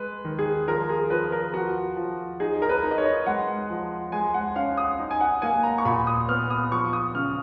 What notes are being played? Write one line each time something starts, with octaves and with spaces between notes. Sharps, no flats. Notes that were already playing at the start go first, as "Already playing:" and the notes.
Already playing: G#3 B4
D#3
G#4
F3 A#4
G#4
F3 B4
A#4
F3 F#4
F3
D#4 G#4
A#4
B4
D#4
D#5
C#5
G#3 F#5
F3
G#3 G#5
F#5
C#4 F5
D#6
D#4
G#5
F#5
A#3 G#5
A#5
C#6
A#2 B5
D#6
B3 F6
D#6
F3 C#6
D#6
C#3 F6